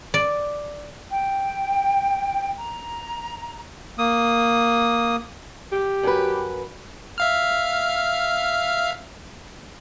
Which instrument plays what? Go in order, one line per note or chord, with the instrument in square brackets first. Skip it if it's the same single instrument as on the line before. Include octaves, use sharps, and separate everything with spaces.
[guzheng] D5
[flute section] G5
A#5
[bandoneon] A#3 D#6
[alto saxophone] G4
[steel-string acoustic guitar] F#2 B4
[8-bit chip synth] E5 F5 F6